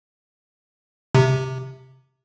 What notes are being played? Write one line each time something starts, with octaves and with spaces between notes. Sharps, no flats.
C3